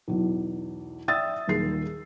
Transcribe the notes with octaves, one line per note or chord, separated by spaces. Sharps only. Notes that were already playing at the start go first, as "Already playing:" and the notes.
B1 E2
D5 E5 G5 D#6 E6 A6
D#1 D#2 G#4 C7